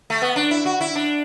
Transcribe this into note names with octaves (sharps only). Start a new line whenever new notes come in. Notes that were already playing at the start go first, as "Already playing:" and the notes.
A3
B3
D4
E4
F#4
E4
D4